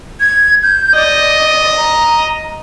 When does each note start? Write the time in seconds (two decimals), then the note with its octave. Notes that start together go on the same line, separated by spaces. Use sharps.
0.20 G#6
0.63 G6
0.95 D5 D#5
1.77 A#5